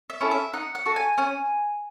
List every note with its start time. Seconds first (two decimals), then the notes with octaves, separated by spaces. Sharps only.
0.10 E5
0.21 C#4 E4 A4
0.31 E5
0.53 D#4 F#5
0.75 F#5
0.86 F#4 A4
0.96 G#5
1.18 C#4 G#5